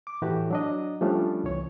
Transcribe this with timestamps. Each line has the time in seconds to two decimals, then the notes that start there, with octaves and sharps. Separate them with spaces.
0.07 D6
0.22 A2 E3 A3 F#4 G4
0.51 F#3 D4 D#5
1.01 F3 G3 A3 C#4 D4 F4
1.44 C2 E3 C#5